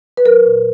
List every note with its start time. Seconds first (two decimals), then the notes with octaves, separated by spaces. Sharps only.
0.17 B4
0.25 F#3 A#4
0.46 A#2